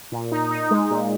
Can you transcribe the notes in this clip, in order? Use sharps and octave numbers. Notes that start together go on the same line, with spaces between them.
A#2
D#4
D#4
G#3
A#2